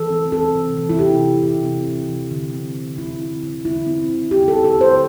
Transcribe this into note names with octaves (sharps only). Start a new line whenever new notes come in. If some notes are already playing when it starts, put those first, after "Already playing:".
Already playing: E3 A4
C4
C4 A4
C3
E3
E4
C3 G4
E3
C3
C4
C3
E3
D3
C4
D3
D3 E4
C4
D3
D3 E4
C4
D3
C4 G4
A4
D3
A4
D3
C5